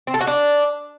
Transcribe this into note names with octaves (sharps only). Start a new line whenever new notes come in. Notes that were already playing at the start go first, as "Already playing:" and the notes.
C4
A4
F#4
D4